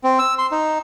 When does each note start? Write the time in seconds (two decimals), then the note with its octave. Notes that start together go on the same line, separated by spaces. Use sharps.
0.04 C4
0.19 E6
0.39 C6
0.52 D#4